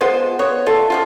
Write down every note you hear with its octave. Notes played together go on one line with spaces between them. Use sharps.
G#3 B3 F4 C5
B3 C#5
F4 A4 E5
F3 A#3 F4